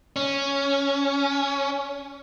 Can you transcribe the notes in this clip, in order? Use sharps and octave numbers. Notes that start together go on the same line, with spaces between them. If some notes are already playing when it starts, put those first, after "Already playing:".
C#4